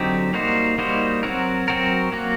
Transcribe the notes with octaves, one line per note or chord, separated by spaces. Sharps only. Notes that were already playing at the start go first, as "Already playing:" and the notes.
Already playing: D3 F#3 C4 D#4 G4
G3 A#3 D#4 F#4 C5
G3 A#3 D#4 F#4 C5
F#3 C4 F#4 A#4
F#3 C4 F#4 A#4
F#3 A#3 F#4